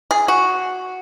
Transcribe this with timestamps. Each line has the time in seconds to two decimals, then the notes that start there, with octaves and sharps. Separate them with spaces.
0.11 G#4
0.28 F#4